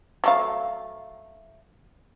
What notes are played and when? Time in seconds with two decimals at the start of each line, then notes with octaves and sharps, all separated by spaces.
0.24 F#3 A3 F5